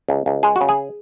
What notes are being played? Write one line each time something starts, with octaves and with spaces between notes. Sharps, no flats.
C#2
C#2
G#3 G#4
F#4
C#3
G#4